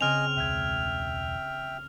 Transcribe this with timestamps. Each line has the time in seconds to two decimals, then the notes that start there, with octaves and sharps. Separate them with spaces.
0.01 C#3 C4 D#5 G#5 F6 F7
0.37 E1 C#2 E5 G5 G#6 D#7